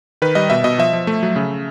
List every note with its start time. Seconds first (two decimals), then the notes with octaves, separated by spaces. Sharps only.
0.22 D#3 B4
0.35 G3 D#5
0.50 B2 E5
0.64 B2 D#5
0.78 F3 E5
0.93 F3
1.07 A3
1.23 F#3
1.36 C#3